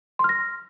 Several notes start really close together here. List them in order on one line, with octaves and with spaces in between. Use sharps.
C6 F6 A#6